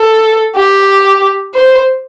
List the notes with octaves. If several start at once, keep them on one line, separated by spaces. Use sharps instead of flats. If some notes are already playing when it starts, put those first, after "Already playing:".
Already playing: A4
G4
C5